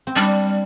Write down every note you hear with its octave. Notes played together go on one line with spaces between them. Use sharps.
C4
G3 D4